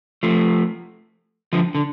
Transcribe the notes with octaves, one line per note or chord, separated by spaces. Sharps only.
F3 A3
D3 F3
D3